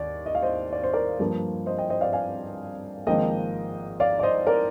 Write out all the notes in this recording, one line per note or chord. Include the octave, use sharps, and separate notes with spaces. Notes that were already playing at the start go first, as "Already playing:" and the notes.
Already playing: D#2 D5
D#5
F5
C5 D#5
D5
C5
A#4 D5
G2 F3 A#3
C5 D#5
D#5 G5
C5 D#5
D5 F5
F5 G#5
G#1 G#2 F3 A#3 D#5 G5
D5 F5
D5
C5 D#5
A#4 D5